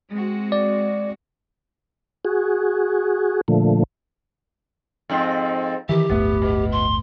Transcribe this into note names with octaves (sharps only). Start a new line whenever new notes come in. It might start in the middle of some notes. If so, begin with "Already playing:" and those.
G#3 C4 F#4
D5
F#4 G#4
A#2 D3 F3 A3
F2 G#2 C4
D#3 E3 G4
D1 G1 A3 B3
B2
C6